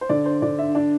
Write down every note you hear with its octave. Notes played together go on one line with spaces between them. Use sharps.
C5
D3 D5
C5
D3 D5
E5
D4 D5